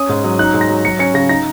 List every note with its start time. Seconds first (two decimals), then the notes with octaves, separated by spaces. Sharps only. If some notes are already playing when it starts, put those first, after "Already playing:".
Already playing: C#4 D#6
0.09 G#2
0.24 F#3
0.39 D#4 F#6
0.54 G#2
0.61 A#6
0.69 F#3
0.84 F#3 C#7
0.99 C#4 C#7
1.14 C#3 A#6
1.29 D#4 A#6